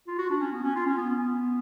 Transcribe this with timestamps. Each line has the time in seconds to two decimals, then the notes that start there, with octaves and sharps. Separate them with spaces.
0.07 F4
0.18 F#4
0.30 D4
0.40 C#4
0.52 B3
0.64 C#4
0.75 F4
0.86 C#4
0.97 B3
1.10 B3